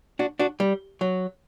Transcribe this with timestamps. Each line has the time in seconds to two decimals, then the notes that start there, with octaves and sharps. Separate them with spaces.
0.19 D4 F#4
0.39 D4 F#4
0.60 G3
1.01 F#3